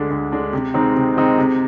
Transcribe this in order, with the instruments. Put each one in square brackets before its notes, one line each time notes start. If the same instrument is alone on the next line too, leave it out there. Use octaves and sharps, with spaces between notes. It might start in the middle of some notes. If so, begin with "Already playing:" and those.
Already playing: [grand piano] D2 D3 G#3 D4
D2
D3 G#3 D4
C3
D#3 G#3 C4 D#4
C3
D#3 G#3 C4 D#4
C3